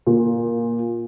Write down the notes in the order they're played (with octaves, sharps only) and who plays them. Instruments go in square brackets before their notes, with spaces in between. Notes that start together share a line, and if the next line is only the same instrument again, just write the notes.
[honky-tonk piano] A#2